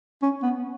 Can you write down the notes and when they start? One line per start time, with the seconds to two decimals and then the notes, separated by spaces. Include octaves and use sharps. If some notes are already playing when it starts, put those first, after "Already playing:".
0.22 C#4
0.43 B3